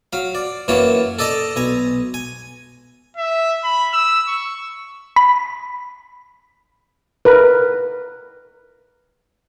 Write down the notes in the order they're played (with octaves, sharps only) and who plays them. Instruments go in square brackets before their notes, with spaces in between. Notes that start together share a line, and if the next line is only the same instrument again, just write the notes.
[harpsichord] F#3 F5
D5
F#2 E3 F#3 A#3 C#5 A5
A4 D5 D#5 A5 A#5
B1 G#5 A#5
G#5
[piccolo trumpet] E5
B5
E6
C#6
[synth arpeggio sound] B5
[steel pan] A#4 B4